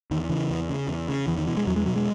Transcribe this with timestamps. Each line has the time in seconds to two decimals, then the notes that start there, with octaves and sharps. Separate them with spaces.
0.11 E2 D#3
0.29 C#3 E3
0.50 E2
0.69 C#3
0.88 E2
1.08 C#3
1.27 E2 E3
1.38 D#3
1.47 B2 E3
1.57 G#3
1.67 E2 F#3
1.76 G#3
1.86 B2 F#3
1.96 G#3